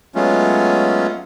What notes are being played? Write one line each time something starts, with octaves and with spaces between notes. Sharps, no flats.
F#3 G#3 A3 B3 C#4 F4